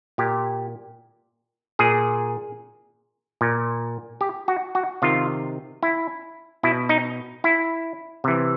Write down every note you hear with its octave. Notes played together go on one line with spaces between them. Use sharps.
A#2 G4
A#2 G#4
A#2
G4
F#4
F#4
C3 D#3 F4
E4
B2 E4
D#4
E4
C3 E3